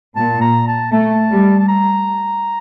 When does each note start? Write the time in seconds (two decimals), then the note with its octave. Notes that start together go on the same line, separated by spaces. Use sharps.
0.16 A#2 A5
0.41 A#5
0.67 A5
0.92 A3 A5
1.31 G3
1.60 A5
1.68 A#5